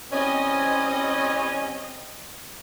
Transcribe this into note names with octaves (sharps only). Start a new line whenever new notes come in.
E3 G3 C4 C#4 D#5